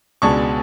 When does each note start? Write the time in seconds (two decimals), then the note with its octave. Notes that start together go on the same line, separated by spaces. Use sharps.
0.22 C#2 B2 G#3 D4 A5 C#6